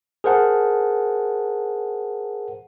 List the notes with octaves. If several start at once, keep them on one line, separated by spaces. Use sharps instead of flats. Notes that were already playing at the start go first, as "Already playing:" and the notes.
G#4 A#4 C5 F#5 A5